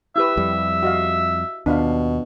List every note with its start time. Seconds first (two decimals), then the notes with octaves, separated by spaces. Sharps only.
0.16 E4 G4 B4 E5
0.37 F2 G3
0.83 F#4 D#5 F5
1.66 D#2 B2 D4 F4 F5